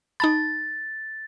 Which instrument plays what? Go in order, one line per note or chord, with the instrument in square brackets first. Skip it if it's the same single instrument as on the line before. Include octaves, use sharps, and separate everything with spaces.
[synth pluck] D#4 A5 B5 [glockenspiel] A6